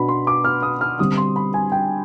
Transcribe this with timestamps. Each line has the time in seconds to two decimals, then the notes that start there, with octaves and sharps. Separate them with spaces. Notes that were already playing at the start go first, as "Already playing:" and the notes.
Already playing: B2 B3 D4 B5
0.08 C6
0.27 D6
0.44 F6
0.62 D#6
0.81 F6
0.99 D3 G3 C4 D#6
1.17 C6
1.36 B5
1.54 G#5
1.72 G5